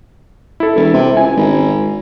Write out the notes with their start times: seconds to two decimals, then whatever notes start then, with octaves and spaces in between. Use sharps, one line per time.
0.60 E4 A4
0.76 E1
0.94 C3
1.17 C#2 G#5
1.37 G#1